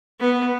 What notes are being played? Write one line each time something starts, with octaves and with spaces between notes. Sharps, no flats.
B3